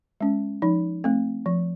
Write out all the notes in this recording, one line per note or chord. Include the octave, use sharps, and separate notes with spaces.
G#3 C#4
F3 D#4
A3 C4
F3